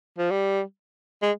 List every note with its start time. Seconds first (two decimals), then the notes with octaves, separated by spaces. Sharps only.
0.19 F3
0.31 G3
1.22 G#3